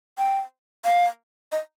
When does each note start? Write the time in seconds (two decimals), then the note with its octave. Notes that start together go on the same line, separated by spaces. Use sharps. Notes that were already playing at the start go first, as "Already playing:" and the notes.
0.18 G5
0.85 F5
1.52 D#5